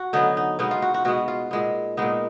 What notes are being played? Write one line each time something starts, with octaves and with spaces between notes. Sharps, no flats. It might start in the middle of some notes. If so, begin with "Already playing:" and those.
Already playing: F#4
D3 F#3 B3 D#4
D#4
B2 G#3 B3 D#4
F4
F#4
F#4
B2 G#3 B3 F#4
F4
A#2 G#3 B3
A#2 G#3 B3 D#4